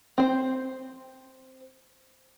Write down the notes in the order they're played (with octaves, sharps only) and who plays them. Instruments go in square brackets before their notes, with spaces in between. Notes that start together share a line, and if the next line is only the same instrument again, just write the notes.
[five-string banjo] C4 C5